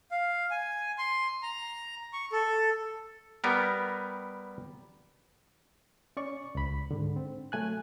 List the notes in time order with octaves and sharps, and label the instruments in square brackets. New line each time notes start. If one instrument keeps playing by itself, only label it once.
[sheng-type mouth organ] F5
G#5
C6
A#5
C#6
A4
[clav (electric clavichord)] G3 B3 A#4
[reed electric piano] C#4 D5 C#6
C#2 B5
G#2 D3
C4
F#3 A3 G#5 F#6